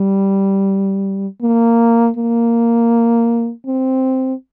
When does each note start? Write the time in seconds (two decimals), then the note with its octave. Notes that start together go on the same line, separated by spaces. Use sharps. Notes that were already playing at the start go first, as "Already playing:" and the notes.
Already playing: G3
1.42 A#3
2.17 A#3
3.67 C4